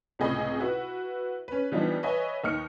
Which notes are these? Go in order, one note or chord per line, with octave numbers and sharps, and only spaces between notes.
C#2 A2 C3 G#4 D#5 B5
E4 F#4 B4
C#4 B4
E3 F3 G3 B3 D4 D#4
B4 C#5 D#5 E5 G#5
D#2 D#4 F6 C#7